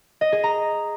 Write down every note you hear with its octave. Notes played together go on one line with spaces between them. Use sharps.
D#5
G#4
A#5